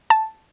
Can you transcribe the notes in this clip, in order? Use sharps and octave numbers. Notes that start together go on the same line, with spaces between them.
A5